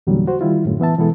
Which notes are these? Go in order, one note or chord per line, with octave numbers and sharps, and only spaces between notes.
E2 A#2 D3 F#3 G3
F#4 C5
D#3 G3 E4 F4
F#2 A2 D3
E3 B3 E5 A5
B2 E3 G#3 B3 E4 A4